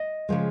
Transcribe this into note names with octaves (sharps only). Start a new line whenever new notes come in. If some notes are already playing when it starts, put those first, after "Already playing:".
Already playing: D#5
C#3 F3 G#3